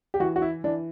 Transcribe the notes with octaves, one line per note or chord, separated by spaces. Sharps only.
G4
E3 F#4
F#4
E4
E3 D4